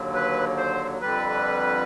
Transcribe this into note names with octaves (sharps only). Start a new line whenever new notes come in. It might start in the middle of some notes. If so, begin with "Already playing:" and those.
Already playing: D#2 D3 F#3
B4
C5
F2 D3 G3 B4